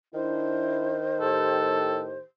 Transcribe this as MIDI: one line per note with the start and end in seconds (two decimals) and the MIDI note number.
0.14 2.20 51
0.14 1.04 62
0.14 1.04 64
0.14 2.19 72
1.21 2.16 45
1.21 2.16 67
1.21 2.02 69